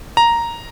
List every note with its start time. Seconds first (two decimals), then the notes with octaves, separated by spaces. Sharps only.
0.17 A#5